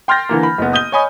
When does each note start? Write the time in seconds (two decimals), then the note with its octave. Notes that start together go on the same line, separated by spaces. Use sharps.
0.08 G5 C6 F6 G6 A6 A#6
0.29 D3 E3 A#3
0.43 B5
0.58 F#1 B3
0.73 D#6 G6 D#7 G7
0.92 C#5 D#5 G#5 B5 D#6